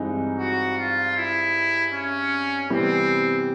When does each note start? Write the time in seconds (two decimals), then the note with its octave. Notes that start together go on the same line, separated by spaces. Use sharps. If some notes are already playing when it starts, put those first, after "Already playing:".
Already playing: G2 E3 G#3 C4 D#4
0.39 F#4
0.78 F4
1.17 E4
1.93 C#4
2.70 C3 E3 G3 B3 C4